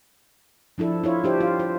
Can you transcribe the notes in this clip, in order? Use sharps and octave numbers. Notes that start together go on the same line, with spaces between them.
F3 D4 E4 A4
E4 F4 C#5
D4 G4 C5
F4
C5